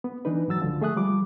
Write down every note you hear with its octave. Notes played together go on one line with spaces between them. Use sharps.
B3
E3 D4 D#4 B4
G#2 E3 F#3 E6 A6
C#2 D3 F3
A3 G#4 E5 D#6 F#6
F3 G3 D6